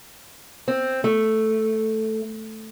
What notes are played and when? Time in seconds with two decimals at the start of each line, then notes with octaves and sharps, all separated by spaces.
0.68 C4
1.04 A3